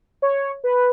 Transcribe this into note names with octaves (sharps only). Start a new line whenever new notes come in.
C#5
B4